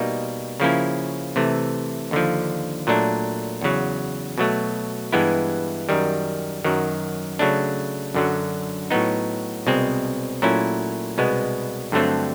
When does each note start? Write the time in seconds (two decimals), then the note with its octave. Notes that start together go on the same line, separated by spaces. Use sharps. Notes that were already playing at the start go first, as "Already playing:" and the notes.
Already playing: B2 G3 A#3 D#4
0.60 C#3 F3 A#3 C#4 E4
1.36 C3 E3 A3
2.11 D#2 D3 F3
2.87 A#2 F#3 A3 D4
3.62 E2 C#3 F#3
4.38 B2 F#3 A3
5.13 G2 E3 G#3 B3 E4
5.89 F#2 D#3 G3
6.64 F#2 D#3 F#3
7.39 C#3 F#3 A3 D4
8.14 F#2 D3 F#3
8.91 A2 F#3 B3 D#4
9.67 C2 B2 G#3 C4
10.42 A#2 F#3 A3 C#4 E4
11.18 C2 B2 G#3 B3
11.92 G2 D3 F#3 A3 C4